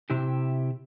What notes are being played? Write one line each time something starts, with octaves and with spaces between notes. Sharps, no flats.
C3 E4 G4